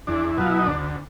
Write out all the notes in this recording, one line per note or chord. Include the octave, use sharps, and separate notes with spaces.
E2 D4
B2 F#3 F4
E4
D#4
D2 D4